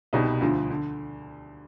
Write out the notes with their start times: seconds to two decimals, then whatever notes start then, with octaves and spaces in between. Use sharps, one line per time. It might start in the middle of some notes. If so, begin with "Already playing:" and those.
0.13 C2 B2 G3 B3 D#4
0.41 D2 D3 F3
0.70 D3